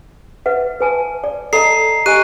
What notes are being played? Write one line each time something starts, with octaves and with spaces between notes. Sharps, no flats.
B4 E5 F#5
B4 G#5 A5
D5
A4 D#5 A5 A#5 C7
G4 D#5 G#5 F#6 D#7